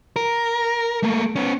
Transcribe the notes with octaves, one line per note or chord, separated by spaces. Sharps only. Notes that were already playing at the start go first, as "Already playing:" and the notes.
A#4
A3 A#3
B3 C#4